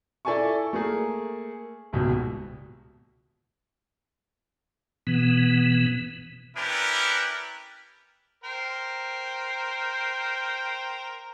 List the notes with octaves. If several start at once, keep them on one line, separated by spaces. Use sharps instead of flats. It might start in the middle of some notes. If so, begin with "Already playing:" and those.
E4 A4 D5 G#5 A5 C#6
A3 A#3 G#4
D#1 C#2 B2
B2 E3 B3
C#4 D4 E4 G4 A#4 B4
A#4 C5 G5